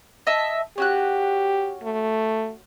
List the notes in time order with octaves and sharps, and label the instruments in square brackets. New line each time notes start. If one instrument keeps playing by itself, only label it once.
[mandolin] D#5 E5 A5
[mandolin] C#4 F#4 F#6 [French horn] G4
[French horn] A3